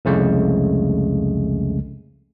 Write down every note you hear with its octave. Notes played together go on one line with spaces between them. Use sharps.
C2 F2 C#3 G#3 A3